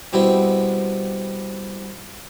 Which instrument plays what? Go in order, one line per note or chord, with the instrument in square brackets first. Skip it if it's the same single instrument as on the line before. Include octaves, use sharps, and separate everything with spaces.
[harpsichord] B2 G3 C4 E4